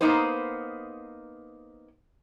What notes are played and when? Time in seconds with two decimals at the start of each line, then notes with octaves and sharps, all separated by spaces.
0.01 A#3 B3 D#4 B4 C5